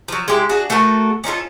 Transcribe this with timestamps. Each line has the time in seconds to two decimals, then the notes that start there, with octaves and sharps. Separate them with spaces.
0.08 F3 F#3
0.28 G#3 E4 G4
0.49 D4 F#4 G#4
0.70 A3 F#4 A4 A#4
1.24 C#4 D#4 F4 A4